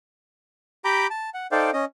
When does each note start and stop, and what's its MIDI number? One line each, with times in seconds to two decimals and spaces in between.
0.85 1.07 67
0.85 1.07 79
0.85 1.07 82
0.85 1.07 83
0.85 1.07 86
0.85 1.07 91
1.10 1.30 81
1.34 1.47 78
1.52 1.71 63
1.52 1.71 69
1.52 1.71 72
1.52 1.71 74
1.52 1.71 77
1.52 1.71 79
1.73 1.85 61
1.73 1.85 75